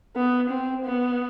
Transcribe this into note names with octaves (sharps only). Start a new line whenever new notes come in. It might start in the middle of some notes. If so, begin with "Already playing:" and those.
B3
C4
B3